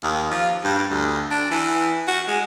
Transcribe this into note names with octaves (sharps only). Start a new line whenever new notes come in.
D#2
F3
G2
D2
D4
E3
F#4
G#3